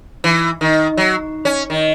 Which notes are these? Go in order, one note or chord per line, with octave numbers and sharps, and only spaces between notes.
E3
D#3
F#3
C#4
D#3